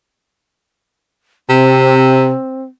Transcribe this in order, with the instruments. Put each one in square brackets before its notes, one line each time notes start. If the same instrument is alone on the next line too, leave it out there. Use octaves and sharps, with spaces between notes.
[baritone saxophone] C3 [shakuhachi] C4